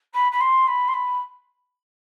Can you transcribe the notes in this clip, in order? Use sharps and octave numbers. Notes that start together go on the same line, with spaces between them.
B5
B5
C6
B5
C6
B5